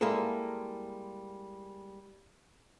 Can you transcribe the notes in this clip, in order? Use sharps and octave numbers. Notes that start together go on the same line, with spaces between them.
G3 G#3 A#3 E4 G#4 A4